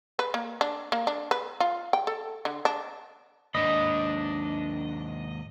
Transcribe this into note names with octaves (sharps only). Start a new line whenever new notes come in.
B4
A#3
D4
A#3
D4
B4
F4
G5
A4
D3
D4
D#2 G#2 D4 D#5 B5